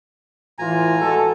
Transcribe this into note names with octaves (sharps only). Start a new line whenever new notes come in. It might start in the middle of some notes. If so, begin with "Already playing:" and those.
A2 E3 F4 G#5 A#5
G#3 F#4 A4